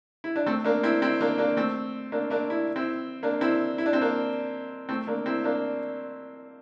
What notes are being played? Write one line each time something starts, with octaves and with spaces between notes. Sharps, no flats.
E4
D4
A3 C4
A#3 D4
C4 E4
C4 E4
A#3 D4
A#3 D4
A3 C4
A#3 D4
A#3 D4
E4
C4 E4
A#3 D4
C4 E4
E4
D4
C4
A#3 D4
A3 C4
A#3 D4
C4 E4
A#3 D4